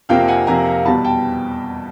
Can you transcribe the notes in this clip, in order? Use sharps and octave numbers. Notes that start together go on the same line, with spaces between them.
F2 C3 F3 A#3 F5 G5
F#5 G#5
F2 C3 F3 A#3 G#5 A#5
E2 B2 G3 A5 B5
G5 A5